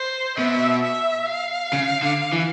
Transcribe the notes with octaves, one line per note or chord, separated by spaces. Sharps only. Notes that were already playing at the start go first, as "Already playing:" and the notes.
Already playing: C5
B2 E5
E5
F5
C#3
D3
E3